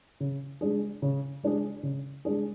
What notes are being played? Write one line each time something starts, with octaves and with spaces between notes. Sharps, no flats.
C#3
G#3 D4 G#4
C#3
G#3 D4 G#4
C#3
G#3 D4 G#4